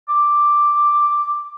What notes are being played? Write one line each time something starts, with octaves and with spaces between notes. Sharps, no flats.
D6